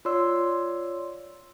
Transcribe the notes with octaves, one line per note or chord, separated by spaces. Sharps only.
F4 C#5 D5 C6 E6